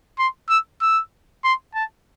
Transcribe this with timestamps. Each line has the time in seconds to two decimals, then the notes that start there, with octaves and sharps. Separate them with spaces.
0.19 C6
0.49 E6
0.81 E6
1.44 C6
1.75 A5